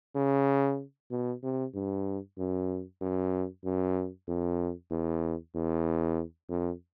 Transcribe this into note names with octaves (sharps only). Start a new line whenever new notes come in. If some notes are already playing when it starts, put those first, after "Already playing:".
C#3
B2
C3
G2
F#2
F#2
F#2
F2
E2
E2
F2